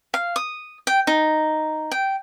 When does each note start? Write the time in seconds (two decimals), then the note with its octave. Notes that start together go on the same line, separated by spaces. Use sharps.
0.14 F5
0.36 D#6
0.87 G5
1.07 D#4
1.91 G5